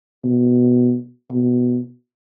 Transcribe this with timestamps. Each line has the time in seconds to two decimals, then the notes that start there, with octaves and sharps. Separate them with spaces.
0.24 B2
1.31 B2